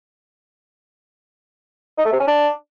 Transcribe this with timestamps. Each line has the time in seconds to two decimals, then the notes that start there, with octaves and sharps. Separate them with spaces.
1.98 D#4
2.05 A3
2.13 C3
2.20 C#4
2.27 D4